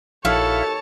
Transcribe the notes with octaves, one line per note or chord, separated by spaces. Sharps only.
A#1 D#2 E4 F#4 A4 C#5 F5 A5